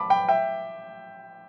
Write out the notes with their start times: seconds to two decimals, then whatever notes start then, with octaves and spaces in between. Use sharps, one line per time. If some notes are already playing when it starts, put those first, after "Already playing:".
Already playing: A5 B5 D6
0.10 G5 B5
0.29 E5 G5